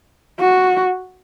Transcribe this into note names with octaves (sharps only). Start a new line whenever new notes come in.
F#4